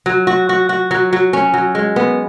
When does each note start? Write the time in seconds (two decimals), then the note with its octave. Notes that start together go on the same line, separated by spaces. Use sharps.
0.06 F#3
0.27 F#4
0.49 F#4
0.69 F#4
0.91 F#3
1.13 F#3
1.33 C#4
1.54 F#3
1.75 G#3
1.96 B3